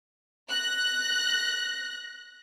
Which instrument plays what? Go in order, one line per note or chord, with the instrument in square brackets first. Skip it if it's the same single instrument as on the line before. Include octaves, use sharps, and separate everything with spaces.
[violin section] F#6 A#6